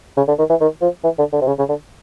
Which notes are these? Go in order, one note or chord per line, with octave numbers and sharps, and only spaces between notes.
C#3
D3
D#3
E3
D#3
F3
E3
D3
D3
C3
C#3
C#3
D3